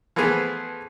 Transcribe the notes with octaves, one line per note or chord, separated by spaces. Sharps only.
E3 F3 A3 B3 G#4